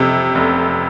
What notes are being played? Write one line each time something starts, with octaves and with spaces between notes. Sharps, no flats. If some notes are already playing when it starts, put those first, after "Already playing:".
Already playing: F2 C3
F1